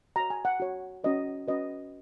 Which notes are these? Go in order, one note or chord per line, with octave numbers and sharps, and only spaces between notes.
F#4 C#5 A#5
G#5
F#5
F#4 C#5
C#4 F#4 B4 D#5
C#4 F#4 B4 D#5